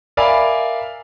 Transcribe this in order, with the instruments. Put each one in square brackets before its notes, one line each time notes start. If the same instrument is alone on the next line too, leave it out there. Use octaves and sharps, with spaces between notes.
[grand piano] A#4 D5 E5 F5 G#5 B5